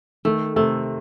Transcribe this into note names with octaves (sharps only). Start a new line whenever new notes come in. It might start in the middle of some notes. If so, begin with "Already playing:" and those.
D#3 A3
C3 A3